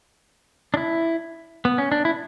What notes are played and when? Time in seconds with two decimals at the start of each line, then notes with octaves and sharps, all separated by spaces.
0.74 D4
0.77 E4
1.65 B3
1.78 C#4
1.92 D4
2.05 E4